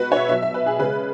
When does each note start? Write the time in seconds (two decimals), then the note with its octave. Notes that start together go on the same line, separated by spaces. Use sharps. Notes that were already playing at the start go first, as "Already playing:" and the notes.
Already playing: B2 G#3 F#4 B4
0.12 C#5
0.16 E5
0.29 B2 F#3 E5
0.42 E5
0.54 B4
0.66 G#4
0.79 C#3 G#3 B4